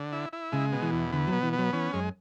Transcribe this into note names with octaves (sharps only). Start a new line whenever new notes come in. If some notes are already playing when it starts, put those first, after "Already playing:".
Already playing: D3
E4
E4
C#3 G#3
B2
E3
E2
D3 B3
F#3
B2
E3
B3
F#3
E3 C#4
F#2 G#3